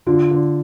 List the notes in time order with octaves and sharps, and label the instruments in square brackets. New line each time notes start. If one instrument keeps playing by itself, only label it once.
[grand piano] D3 [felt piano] F4
[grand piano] D3